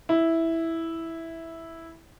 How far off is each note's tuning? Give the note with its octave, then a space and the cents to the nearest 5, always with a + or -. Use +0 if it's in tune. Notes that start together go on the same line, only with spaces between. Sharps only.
E4 -5